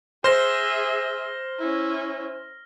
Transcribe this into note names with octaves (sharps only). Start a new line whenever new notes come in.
G#4 C5 E5 F6 A#6
C#4 E4